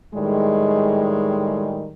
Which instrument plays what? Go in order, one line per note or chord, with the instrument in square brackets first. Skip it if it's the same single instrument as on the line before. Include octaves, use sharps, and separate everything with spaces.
[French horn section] A2 D#3 G3 G#3